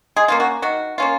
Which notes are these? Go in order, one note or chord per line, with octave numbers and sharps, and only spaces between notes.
G#3 G#4
A#3 C#4 F4
F#4
D#3 F#4
A#3 C#4 F4